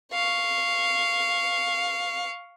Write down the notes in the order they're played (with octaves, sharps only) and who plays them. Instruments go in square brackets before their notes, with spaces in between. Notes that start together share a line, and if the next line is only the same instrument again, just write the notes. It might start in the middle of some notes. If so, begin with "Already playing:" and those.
[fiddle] F5 C#6